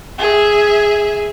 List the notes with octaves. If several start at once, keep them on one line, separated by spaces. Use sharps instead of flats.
G#4 E5